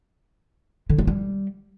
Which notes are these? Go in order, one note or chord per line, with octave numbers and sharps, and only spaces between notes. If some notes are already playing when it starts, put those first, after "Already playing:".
D3
G#3
G3